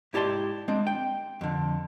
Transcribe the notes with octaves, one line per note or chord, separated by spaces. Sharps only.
G#2 E4 G4 D5 A5 C6
G#3 C4 D4
G5
F2 D3